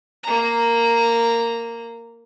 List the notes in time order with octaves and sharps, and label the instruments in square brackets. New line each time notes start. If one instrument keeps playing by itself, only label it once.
[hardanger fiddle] A#3 A#5